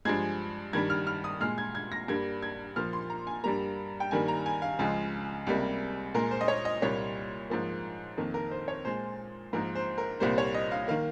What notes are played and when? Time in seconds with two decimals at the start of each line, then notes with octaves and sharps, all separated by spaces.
0.05 G2 F3 G#3 G#6
0.73 G2 D#3 G3 G#6
0.90 F6
1.07 F6
1.24 D#6
1.41 A#2 G#3 F6
1.58 G#6
1.75 G#6
1.92 A#6
2.08 G2 G3 A#3 G#6
2.42 G#6
2.76 A#2 F3 A#3 F6
2.93 C6
3.10 A#5
3.27 G#5
3.44 G2 G3 A#3 A#5
4.00 G5
4.11 G2 D#3 G3 A#3 G#5
4.28 A#5
4.46 G#5
4.62 F5
4.79 C#2 C#3 F3 G#3
5.47 C#2 C3 G3 A#3
6.14 A#2 G#3 A#4
6.31 C5
6.41 D#5
6.48 C#5
6.65 D#5
6.82 C2 A#2 G3 A#3 C#5
7.50 G#2 F3 A#3
8.18 F2 D#3 A#3
8.34 A#4
8.51 C5
8.68 C#5
8.85 A#2 G#3 C5
9.53 G#2 F3 A#3 A#4
9.75 C5
9.98 A#4
10.20 C2 A#2 G3 A#3 C5
10.38 C#5
10.54 D#5
10.71 F5
10.88 D#3 A#3 F5